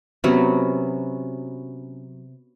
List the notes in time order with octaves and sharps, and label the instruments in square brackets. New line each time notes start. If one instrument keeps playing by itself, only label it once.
[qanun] C3 F#3 B3 C#4